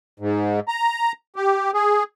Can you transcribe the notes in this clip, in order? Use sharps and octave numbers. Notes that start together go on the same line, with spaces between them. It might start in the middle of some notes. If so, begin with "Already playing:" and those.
G#2
A#5
G4
G#4